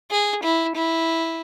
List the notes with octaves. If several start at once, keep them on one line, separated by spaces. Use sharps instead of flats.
G#4
E4
E4